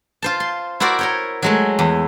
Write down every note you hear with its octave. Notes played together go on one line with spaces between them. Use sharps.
F4 C5 A5
C6
E4 F#4 A#4 C5 D5
A#4 C#5 G5
F#3 G#3 A3
E2